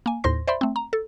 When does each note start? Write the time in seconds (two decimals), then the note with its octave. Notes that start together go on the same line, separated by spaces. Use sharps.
0.06 A#3 G#5
0.24 D#2 A2 C5 C6 A#6
0.47 C5 D5 E5 B5 C6
0.61 A3 C4
0.76 A#5
0.93 A4